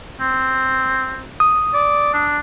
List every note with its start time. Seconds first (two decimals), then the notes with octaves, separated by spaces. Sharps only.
0.20 C4
1.40 D#6
1.74 D5
2.13 D4